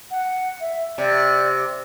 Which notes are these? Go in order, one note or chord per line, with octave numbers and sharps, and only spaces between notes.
F#5
E5
C3 D5